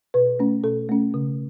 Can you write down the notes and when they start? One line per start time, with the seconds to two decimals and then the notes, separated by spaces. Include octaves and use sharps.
0.14 B2 B4
0.39 A3 C#4
0.64 B2 A4
0.89 A3 C#4
1.14 C#3